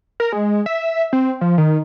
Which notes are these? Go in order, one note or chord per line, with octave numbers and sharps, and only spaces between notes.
A#4
G#3
E5
C4
F3
D#3